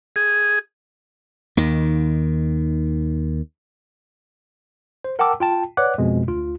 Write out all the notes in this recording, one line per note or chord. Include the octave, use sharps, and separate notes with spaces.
G#4
D#2 D#3
C5
A#4 F#5 G5 A5 D6 E6
F4 G5 A5
B4 C#5 D5 F#5 D6 F#6
F2 B2 G#3
D2 F4